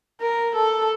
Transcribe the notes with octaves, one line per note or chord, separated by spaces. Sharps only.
A#4
A4